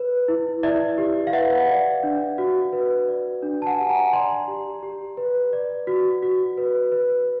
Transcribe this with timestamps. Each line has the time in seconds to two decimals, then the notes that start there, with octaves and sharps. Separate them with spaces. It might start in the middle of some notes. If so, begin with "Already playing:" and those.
Already playing: B4
0.28 E4
0.63 E4 D5 E5
0.98 G4
1.27 F5
1.33 B4 E5 F#5
1.68 D5
2.03 D4
2.38 F#4
2.73 B4
3.08 D5
3.42 D4
3.62 A5
3.66 F#5 G#5
3.78 G4
3.90 G#5 A#5
4.13 D5 A#5 C6
4.48 G4
4.83 G4
5.17 B4
5.53 D5
5.87 F#4
6.23 F#4
6.57 B4
6.92 B4